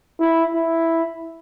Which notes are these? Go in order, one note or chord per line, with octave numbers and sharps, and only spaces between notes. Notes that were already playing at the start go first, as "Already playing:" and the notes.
E4
E4